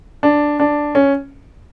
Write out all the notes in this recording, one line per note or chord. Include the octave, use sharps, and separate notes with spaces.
D4
D4
C#4